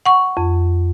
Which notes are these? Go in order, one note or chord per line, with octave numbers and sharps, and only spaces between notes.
F#5 C#6
F2